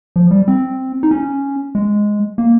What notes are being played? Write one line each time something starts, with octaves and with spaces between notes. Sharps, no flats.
F3
G3
C4
D#4
C#4
G#3
A#3